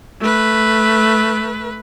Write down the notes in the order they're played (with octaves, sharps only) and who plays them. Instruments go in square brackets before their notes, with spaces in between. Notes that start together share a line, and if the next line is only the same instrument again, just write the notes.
[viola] A3 B4